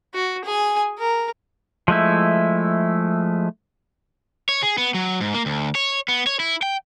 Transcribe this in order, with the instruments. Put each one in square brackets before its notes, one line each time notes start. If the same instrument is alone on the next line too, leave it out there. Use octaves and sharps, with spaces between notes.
[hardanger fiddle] F#4
G#4 G#5
A#4
[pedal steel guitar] F3 G#3 A3 E4
[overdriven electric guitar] C#5
G#4
B3
F#3
G#2
A#3
D2
C#5
B3
C#5
E4
G5